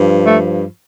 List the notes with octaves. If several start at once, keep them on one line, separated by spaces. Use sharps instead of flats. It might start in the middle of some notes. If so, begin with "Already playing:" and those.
Already playing: G2 F3
A3